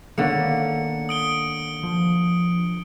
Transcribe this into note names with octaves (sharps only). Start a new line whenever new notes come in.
D3 D#3 A#3 B3 C#5 C#7
D#6 D7 G7
F3